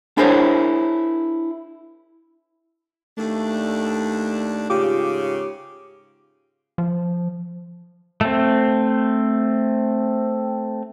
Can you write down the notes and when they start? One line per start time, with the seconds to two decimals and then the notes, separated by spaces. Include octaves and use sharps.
0.17 D4 E4 G#4 A#4 C5 C#5
3.18 D#2 A3 D4
4.70 G#2 C#3 F4 G4 D6
6.78 F3
8.21 A3 C4